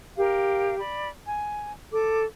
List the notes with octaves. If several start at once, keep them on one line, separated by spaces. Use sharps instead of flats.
G4 A#4 F5
D5 B5
G#5
A4 D6